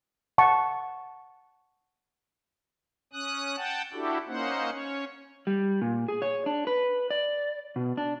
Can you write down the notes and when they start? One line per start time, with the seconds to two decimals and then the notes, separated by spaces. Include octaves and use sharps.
0.38 F#5 A5 C#6
3.13 C#4 D#6 F#6
3.57 F#5 G5 A5
3.93 D4 E4 F#4 G4 A4
4.27 A#3 C#4 D#4 C5 F#5
4.72 C#4 C#5
5.47 G3
5.81 A#2
6.08 G#4
6.22 C#5
6.46 D4
6.67 B4
7.10 D5
7.76 B2
7.97 D4